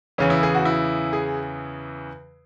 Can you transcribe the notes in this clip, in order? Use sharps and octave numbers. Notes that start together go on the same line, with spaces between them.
E2 C#3 E3 C#4
E4
G#4
F#4
E4
G#4